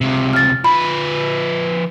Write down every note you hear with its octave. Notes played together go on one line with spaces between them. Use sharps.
C#2 C3
F6 A6
F3 B4 B5